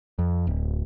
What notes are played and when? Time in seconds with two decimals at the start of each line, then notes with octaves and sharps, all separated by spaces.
0.19 F2
0.47 D1